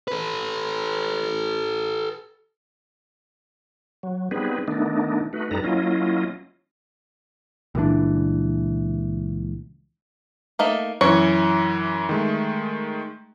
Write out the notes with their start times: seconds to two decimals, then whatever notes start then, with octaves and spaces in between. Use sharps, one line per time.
0.08 A4 B4
4.03 F#3
4.31 G3 B3 C4 D#4 G#4 B4
4.68 D#3 A3 B3 D4 D#4
5.33 A3 D#4 F#4 B4
5.51 F#2 G3 D#4 A4 B4 A#5
5.64 F#3 A#3 C#4 E4 F4 D#5
7.75 C#2 A#2 E3 D4
10.59 A3 A#3 D#4
11.01 F#2 E3 C#5
12.09 D#3 G#3 A3